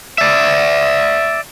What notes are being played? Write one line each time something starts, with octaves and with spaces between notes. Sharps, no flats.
D5 E5